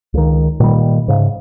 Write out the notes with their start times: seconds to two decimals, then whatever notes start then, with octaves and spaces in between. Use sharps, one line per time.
0.14 C#2 D#3
0.60 A#2 D#3 G3
1.08 G#2 C#3